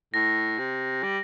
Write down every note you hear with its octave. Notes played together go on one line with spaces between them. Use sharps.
A2 A#6
C3
G3